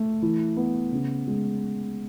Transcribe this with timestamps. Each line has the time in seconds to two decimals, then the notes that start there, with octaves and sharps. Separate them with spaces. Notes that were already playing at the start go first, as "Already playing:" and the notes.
Already playing: A3
0.22 E3
0.57 B3
0.92 C#3
1.27 G#3